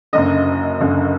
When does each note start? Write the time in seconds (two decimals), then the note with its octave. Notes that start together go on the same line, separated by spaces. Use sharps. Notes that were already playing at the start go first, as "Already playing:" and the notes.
0.13 F#1 F#2 D3 D#5
0.80 F#1 F#2 D3